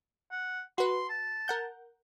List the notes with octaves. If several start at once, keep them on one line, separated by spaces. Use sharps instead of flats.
F#5
F#4 B4 C6
A5
A#4 F#5 G6